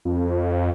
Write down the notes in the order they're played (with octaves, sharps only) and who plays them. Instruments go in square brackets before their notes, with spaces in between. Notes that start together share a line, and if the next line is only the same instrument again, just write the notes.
[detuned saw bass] F2